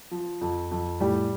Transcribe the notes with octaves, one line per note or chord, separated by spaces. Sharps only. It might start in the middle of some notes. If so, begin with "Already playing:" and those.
F3
F2
F2
A2 G3 G4